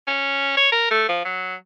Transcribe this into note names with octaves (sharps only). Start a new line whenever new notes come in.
C#4
C#5
A#4
A3
F3
F#3